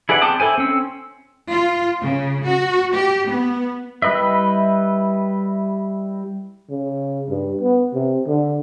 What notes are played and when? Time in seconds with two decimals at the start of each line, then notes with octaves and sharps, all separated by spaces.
0.09 E4 G#4 B4 D5 F#5
0.22 C4 G5 A5 D6 D#6
0.40 E4 A4 C5 G#5
0.58 C4 C#4 E6
1.51 F4
2.02 C#3
2.46 F#4
2.95 G4
3.30 B3
4.02 G3 E4 B4 D#5 E5
6.70 C#3
7.29 G2
7.61 B3
7.93 C3
8.27 D3